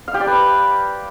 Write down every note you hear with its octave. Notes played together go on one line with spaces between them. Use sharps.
F5
G4
D5
B4